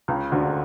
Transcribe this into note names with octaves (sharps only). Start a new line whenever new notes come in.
C#2 C#3
D2 D3